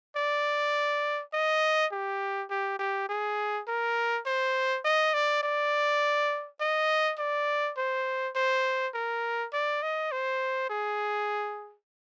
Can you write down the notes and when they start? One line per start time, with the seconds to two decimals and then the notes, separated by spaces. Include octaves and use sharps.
0.16 D5
1.33 D#5
1.92 G4
2.50 G4
2.79 G4
3.09 G#4
3.67 A#4
4.26 C5
4.84 D#5
5.14 D5
5.43 D5
6.60 D#5
7.19 D5
7.77 C5
8.35 C5
8.94 A#4
9.53 D5
9.82 D#5
10.12 C5
10.70 G#4